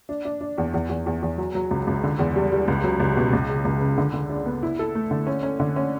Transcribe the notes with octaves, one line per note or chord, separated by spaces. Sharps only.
D4
D4
D4
E2
E2
E2
E2
E2
F#3
F#3
C#2
C#2
D3
E2
G3
G3
C#2
F#3
C#2
B2
C#2
C#3
C#2
C#3
D3
D3
D4
B3
E4
A4
A3
D3
C#4
C#4
D3
C#4